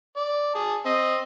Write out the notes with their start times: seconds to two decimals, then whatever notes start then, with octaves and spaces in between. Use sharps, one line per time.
0.17 D5
0.55 G#4 A5
0.85 C4 D#5